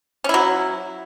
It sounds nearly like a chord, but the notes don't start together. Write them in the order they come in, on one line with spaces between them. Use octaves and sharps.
C#4 E4 F#3